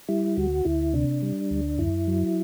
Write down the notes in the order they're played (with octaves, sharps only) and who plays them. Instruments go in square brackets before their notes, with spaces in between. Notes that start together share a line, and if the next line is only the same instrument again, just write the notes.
[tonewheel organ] G3 E4
D2 F#4
D2 E4
C3 D4
G3
D2
F#2 E4
F#3